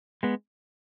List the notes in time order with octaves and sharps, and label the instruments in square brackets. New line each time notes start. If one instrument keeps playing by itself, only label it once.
[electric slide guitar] G#3 B3